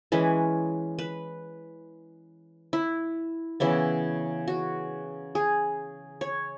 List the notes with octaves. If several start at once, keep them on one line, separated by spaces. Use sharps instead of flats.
E3 G#3 C#4 B4
B4
E4
C#3 E3 B3 E4
F#4
G#4
C#5